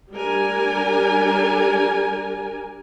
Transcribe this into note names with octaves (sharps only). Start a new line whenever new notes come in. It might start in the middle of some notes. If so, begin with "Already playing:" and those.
G3 D4 A#4 G#5